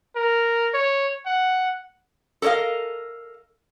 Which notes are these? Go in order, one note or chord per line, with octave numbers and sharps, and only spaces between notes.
A#4
C#5
F#5
A4 A#4 C#5 D#5 F5